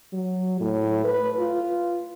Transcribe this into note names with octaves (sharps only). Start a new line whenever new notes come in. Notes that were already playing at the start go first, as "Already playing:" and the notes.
F#3
A2
B4
F4